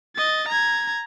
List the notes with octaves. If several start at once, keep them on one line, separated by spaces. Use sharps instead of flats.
D#5 A6
A#5 G#6